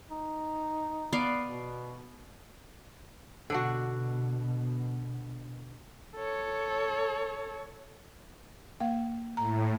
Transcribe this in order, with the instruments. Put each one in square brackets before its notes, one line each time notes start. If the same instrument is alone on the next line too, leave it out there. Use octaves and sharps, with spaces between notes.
[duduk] D#4
[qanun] B3 D5 F5
[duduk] B2
[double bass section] B2 [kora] D3 D4 F#4
[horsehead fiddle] A4 C#5
[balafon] A#3 F5
[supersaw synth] A2 [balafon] A#5